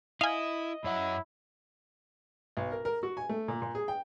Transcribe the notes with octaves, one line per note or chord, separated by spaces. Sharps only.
E4 D#5 F5 G#5
F#2 E4 C#5 F#5
B1
A#4
A#4
F#4
G#5
A3
A#2
A#2
G#4
G5